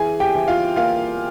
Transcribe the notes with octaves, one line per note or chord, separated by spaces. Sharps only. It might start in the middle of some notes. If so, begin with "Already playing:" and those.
Already playing: E3 G#4 G#5
G4 G5
E3
F4 F5
A#3 F4 F5